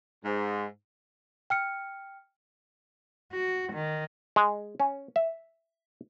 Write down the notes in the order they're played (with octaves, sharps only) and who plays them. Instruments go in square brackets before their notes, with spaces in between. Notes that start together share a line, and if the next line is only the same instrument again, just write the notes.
[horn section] G#2
[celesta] G5 F6 C#7
[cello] F#4
D#3
[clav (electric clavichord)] G#3
C#4
E5